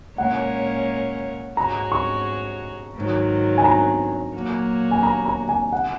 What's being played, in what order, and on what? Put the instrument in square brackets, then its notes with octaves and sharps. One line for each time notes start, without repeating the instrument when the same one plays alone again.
[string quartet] A#2 G#3 C#4 A#4 C#5 [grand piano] F#5
[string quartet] G#2 G#3 F#4 C#5 [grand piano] A#5
[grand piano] C#6
[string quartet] G#2 D#3 F#3
[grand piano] G#5
A#5
[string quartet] A#2 F#3 A#3 F#4 C#5
[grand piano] G#5
A#5
A#5
G#5
F#5